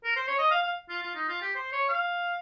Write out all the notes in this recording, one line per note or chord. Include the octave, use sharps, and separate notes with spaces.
A#4
C5
C#5
D#5
F5
F5
F4
F4
D#4
F4
G4
C5
C#5
F5